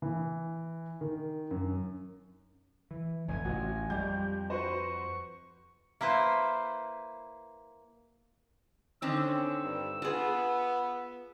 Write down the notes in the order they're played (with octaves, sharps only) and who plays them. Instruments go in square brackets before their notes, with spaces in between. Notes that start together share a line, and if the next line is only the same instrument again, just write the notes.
[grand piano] E3
D#3
F#2
[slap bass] E3
[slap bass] F1 E2 A2 [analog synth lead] G#5
[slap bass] A1 [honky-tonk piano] F#4
[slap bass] F2 [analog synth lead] G3 [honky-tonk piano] G#3 G4 G6
[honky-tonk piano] F#4 B4 C5 [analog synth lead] C#6
[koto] A#3 E4 B4 C5
[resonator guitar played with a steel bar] D3 D#3 C4 [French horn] C#4 [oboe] E6
[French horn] G2
[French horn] B3 [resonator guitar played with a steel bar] F4 G#4